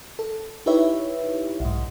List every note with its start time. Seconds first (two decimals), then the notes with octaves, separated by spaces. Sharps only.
0.19 A4
0.66 D#4 E4 G4 B4 C#5 E5
1.60 B1 G#2